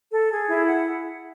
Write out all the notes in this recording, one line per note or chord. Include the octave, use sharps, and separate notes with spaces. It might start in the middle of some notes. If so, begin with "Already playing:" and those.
A4
G#4
E4
F#5